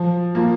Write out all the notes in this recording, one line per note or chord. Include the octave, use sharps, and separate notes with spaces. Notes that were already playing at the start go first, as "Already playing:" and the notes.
Already playing: F3
A#3 F4